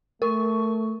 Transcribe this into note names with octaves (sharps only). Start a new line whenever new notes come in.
A3 A#4 C#6